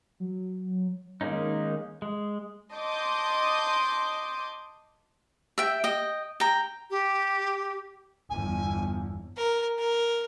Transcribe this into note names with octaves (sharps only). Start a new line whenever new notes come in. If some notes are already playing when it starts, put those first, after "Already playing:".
F#3
D#3 G#3 A#3 C#4 D#4
G#3
D#5 A5 C6 D6 D#6 G6
E5 G5
D#5 G5
G5 A#5
G4
G1 E2 G#5
A#4
A#4